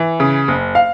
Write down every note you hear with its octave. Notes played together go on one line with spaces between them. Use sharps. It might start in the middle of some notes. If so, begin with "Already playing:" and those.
Already playing: E3
C#3
F#1
F5